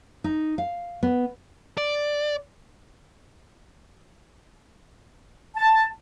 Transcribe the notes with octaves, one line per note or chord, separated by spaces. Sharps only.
D#4
F5
B3
D5
A5